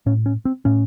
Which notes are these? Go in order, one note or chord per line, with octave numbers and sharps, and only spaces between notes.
A2 C#4
C#4
C4
A2 C#4